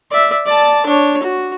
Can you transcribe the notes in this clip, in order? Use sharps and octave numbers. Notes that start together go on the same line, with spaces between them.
D5 E5
D5 A5
D4 C#5
F#4